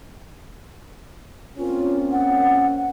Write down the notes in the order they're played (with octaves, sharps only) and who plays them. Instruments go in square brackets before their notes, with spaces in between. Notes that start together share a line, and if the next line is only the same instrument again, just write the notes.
[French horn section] A#3 C4 C#4 [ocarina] F4
[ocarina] F#5